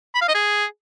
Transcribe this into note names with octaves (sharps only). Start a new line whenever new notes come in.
B5
F5
D#5
G#4